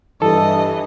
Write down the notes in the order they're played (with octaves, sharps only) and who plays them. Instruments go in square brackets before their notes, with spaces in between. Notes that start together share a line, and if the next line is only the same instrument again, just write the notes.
[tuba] G2 [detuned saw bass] E3 [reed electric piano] A4 [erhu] D#5